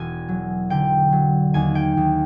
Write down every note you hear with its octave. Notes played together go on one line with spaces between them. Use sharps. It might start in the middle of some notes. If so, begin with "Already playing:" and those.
Already playing: E1 G#5
F#3
D3 G5
F#3
D#2 G#5
G5
D#2